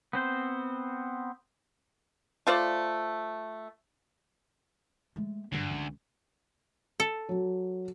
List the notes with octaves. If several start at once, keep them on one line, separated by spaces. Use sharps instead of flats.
B3 C4 C5
A3 F4 C5 D5
G#3 A3
D2 G2 F#3
C#2
A4
F#3